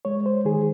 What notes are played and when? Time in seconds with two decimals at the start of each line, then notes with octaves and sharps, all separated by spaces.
0.05 G#3 C#5
0.26 C5
0.45 D#3 G#4